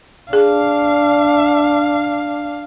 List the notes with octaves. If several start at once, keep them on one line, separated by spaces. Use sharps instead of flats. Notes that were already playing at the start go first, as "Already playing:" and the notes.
D4 G#4 F5